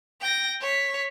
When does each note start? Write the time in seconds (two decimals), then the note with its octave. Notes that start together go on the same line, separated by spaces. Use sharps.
0.21 G5 A#6
0.61 C#5 B6